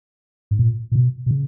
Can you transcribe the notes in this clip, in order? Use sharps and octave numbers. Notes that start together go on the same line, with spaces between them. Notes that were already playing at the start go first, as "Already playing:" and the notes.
G#2
A#2
A#2
B2
B2
C#3